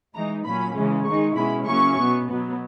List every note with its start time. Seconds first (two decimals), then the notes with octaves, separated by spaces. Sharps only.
0.14 E3 G#3 D#4 A#5
0.44 A#2 F#3 C#4 B5
0.75 C#3 E3 G#3 C#4
1.05 D#3 G#3 D#4 C#6
1.36 B2 G#3 C#4 E4 B5
1.66 C#3 F#3 A#3 C#4 E4 C#6
1.97 B2 F#3 B3
2.28 B2 F#3 B3